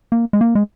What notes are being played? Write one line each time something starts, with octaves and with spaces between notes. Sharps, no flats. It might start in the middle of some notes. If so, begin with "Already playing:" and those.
A#3
G#3
A#3
G#3